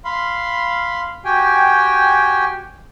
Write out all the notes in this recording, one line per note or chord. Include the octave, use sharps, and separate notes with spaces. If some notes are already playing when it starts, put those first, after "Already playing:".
F5 B5 C6
F#4 G4 G5 G#5